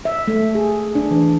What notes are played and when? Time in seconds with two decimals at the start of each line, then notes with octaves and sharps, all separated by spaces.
0.05 E5
0.28 A3
0.55 G#4
0.95 D4
1.11 E3